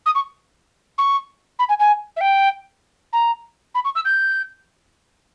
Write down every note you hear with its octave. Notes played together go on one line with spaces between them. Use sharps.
D#6
C#6
C#6
B5
G#5
G#5
E5
G5
A#5
B5
C#6
E6
G6